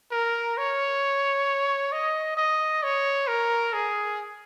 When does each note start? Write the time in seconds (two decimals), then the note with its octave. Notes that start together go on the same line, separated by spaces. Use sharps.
0.11 A#4
0.57 C#5
1.92 D#5
2.37 D#5
2.83 C#5
3.28 A#4
3.73 G#4